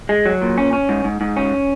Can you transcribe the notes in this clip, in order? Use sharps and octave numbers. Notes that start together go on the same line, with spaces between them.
G#3
F#3
A#2
C#4
C#4
G#2
G#2
G#2
C#4